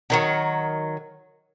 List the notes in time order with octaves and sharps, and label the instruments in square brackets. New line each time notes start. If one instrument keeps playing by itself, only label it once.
[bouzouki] D3 D#3 F#3